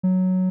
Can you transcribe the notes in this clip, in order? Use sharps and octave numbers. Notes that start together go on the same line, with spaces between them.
F#3